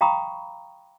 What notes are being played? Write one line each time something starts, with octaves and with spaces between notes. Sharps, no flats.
F5 G5 A#5 B5 C#6 D#6